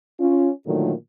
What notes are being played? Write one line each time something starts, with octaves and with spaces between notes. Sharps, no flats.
C#4 F4
A#2 D3 D#3 F3 F#3 A3